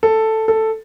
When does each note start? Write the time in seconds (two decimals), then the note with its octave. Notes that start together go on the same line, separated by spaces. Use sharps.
0.03 A4
0.48 A4